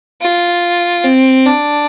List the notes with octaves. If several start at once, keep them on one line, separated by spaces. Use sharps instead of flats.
F4
C4
D4